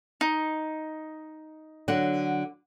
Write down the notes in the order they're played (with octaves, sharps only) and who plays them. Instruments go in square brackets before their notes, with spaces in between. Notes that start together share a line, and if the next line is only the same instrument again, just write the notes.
[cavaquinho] D#4
[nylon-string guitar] D3 F#3 F#5